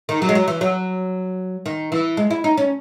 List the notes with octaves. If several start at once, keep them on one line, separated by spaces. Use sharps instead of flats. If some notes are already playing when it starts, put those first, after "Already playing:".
D#3
F#3
G#3
F#3
E3
F#3
D#3
E3
G#3
E4
D#4
C#4